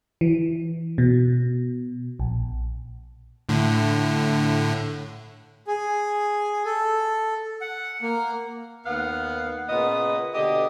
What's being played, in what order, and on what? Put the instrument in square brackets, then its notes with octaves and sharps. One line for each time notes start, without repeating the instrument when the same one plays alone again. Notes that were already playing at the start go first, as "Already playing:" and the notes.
[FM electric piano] E3
B2
A#1
[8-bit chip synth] A2 D3
[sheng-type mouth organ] G#4
A4
F#5
A#3
[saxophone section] D#2 B3 F5 F#5
A#2 C#3 B3 B4 D#5
B2 D3 G4 D#5